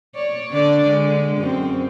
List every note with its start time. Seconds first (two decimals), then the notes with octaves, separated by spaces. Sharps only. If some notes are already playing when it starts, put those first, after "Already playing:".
0.15 C#5 D5
0.51 D3 D4 D5
0.87 D3 G#3
1.37 F#2 C4